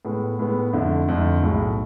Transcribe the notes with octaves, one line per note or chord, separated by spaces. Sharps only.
A2 G#3 B3
A2 G#3 B3
F2 D3 A3 E4
F2 D3 A3 E4
B1 A2 G#3